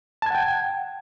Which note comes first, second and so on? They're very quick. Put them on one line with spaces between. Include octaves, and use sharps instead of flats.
A5 G#6 F#5 G5